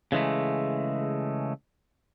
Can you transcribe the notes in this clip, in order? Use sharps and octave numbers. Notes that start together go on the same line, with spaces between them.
C#3 E3 G#3 A3